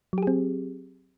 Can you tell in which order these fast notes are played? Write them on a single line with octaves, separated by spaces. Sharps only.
F#3 G4 G#4 C4